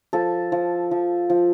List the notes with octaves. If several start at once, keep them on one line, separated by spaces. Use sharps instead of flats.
F3 A4
F3
F3
F3